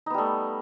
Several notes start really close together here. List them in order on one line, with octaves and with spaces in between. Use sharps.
D#4 B3 G3 A3